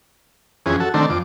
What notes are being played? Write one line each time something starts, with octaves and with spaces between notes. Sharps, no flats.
F2 E3 C#4 G#4
F#4 A4
D3 D#3 A3 C4 D4
F2 D6